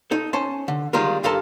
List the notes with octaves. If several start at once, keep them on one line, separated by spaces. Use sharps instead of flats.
D#4 A4
C#4 C5 A5
D3
D#3 G3 G#3 F4 A#4
G2 F4 A4 A#4 A5